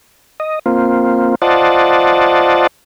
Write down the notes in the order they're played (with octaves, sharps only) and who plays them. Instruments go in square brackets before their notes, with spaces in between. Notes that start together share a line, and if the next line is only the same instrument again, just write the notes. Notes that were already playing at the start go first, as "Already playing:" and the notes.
[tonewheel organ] D#5
A#3 C4 F4
F4 C5 D5 D#5 F#5 A5